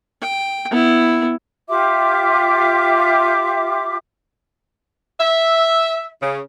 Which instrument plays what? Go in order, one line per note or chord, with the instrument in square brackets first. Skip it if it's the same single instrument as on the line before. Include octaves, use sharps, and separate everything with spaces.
[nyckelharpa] G5
B3 E4
[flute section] F4 G4 E5 D6
[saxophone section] E5
C#3